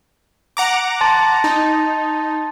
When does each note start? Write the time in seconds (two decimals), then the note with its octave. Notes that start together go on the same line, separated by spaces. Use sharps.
0.57 F#5 A#5 D6
1.01 A5 C6 A6
1.44 D#4